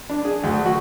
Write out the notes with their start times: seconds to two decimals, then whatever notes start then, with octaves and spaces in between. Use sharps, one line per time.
0.10 D4
0.25 G#4
0.44 D2
0.66 F#4